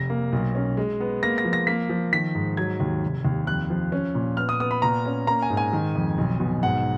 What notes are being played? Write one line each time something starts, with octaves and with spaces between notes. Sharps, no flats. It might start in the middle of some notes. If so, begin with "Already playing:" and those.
Already playing: F1 A#6
A#3
B1
C#4
G#3
B3
A#3 A#6
A#6
F3
A#6
A#3 B6
F3
D#3 B6
G#2
F#3 G#6
D#2
F1
D#2
F2 F#6
F3
C#4
A#2
B3 F6
D#6
B3 D#6
B5
A#2 A#5
C#4
A#3 A#5
G#5
G#2
G#5
D#3
F2
B1
B2
G#2 F#5